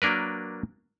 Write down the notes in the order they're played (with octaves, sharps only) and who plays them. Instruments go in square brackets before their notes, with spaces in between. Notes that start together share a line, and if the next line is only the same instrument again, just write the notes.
[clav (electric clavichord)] F#3 A#3 D4 A#4 B4